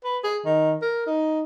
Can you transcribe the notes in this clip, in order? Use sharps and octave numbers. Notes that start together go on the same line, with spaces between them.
B4
G#4
D#3
A#4
D#4